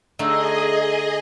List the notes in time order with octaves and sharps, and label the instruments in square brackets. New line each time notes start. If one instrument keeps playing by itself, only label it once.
[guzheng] D3 A3 D#4 [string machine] G#4 D#5